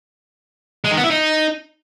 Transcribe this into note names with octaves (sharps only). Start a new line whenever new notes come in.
G#3
D#3
B3
E4
D#4